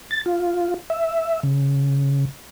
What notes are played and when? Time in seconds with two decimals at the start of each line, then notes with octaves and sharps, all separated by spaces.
0.11 A6
0.26 F4
0.90 E5
1.43 C#3